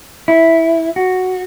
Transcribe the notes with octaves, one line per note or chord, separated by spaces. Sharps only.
E4
F#4